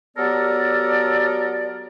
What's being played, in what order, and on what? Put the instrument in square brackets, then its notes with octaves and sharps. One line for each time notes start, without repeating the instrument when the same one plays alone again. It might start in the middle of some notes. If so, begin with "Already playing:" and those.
[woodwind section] F#3 B3 G4 A4 A#4 D5